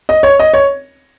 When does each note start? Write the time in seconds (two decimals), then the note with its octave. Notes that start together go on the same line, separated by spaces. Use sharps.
0.09 D#5
0.23 C#5
0.39 D#5
0.53 C#5